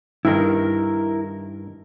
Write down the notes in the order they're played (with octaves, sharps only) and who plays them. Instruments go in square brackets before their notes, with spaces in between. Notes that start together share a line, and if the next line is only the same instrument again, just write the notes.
[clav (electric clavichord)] G2 D#3 [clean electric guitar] E4 A#4